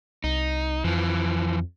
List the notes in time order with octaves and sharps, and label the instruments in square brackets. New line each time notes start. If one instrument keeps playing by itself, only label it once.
[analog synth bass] C2 [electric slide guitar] D#4
[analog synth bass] F2 [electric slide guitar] E3 F3